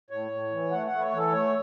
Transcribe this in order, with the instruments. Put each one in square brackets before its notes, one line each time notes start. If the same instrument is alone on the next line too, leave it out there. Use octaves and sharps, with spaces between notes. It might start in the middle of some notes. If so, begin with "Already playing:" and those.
[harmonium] A2 C#5
A2
E3
A3 F#5
F#5
A3
B4
C#5
E3 A4
A3 C#5